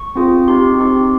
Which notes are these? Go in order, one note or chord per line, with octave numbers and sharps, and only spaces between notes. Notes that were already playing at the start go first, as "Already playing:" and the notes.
Already playing: C#6
C4 F4 G#4
C4 D#4 G4 C6
C4 D#4 G4